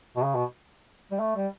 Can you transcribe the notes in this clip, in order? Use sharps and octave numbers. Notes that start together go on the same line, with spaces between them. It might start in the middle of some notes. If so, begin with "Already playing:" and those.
B2
C#3
B2
G3
A3
G3